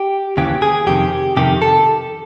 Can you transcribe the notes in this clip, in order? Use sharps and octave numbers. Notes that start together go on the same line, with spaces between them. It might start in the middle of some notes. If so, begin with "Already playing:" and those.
Already playing: G4
D#2 C#3 E3 G4
G#4
F2 C3 D#3 G4
F2 C3 D#3 G4
A4